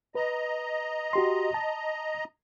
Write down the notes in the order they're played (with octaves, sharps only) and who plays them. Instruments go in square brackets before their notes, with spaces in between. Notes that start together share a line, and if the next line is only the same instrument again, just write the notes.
[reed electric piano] B4 [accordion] D#5 A#5
[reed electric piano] F#4 G4 C6
A5